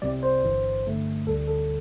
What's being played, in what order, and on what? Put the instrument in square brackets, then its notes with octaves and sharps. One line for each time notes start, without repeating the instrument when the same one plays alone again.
[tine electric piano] C2 C3 G3 D5
C5
G1 G2 E3
G2 D3 A3
D2 D3 G3 A4
A4